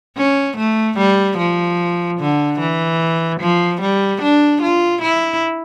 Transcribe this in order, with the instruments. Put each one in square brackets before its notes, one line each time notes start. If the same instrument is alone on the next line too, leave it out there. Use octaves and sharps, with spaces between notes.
[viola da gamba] C#4
A3
G3
F3
D3
E3
F3
G3
D4
F4
E4